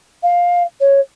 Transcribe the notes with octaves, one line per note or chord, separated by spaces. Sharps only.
F5
C#5